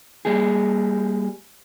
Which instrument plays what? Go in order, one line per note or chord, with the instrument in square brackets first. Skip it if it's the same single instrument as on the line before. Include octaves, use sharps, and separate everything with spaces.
[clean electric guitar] G3 A#3 G4 G#4